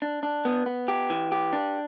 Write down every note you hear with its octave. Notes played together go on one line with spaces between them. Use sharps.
D4
D4
B3
B3
G4
E3
G4
D4